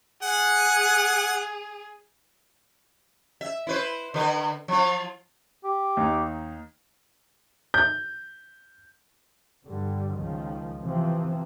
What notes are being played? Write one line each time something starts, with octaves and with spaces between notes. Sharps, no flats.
G#4 F#5
E5
E4 B4 C5
D3 B4
F3 F4
G4
D#2 D#4
G6
G2 D3 G3
C#2 D#3 F3
C3 E3 F3 C4